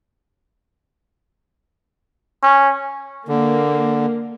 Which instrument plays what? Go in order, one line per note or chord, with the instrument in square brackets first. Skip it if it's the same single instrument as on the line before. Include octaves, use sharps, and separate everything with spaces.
[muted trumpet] C#4
[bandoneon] D3 [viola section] A#3